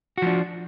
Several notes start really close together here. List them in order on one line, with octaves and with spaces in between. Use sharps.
F#4 F3 D4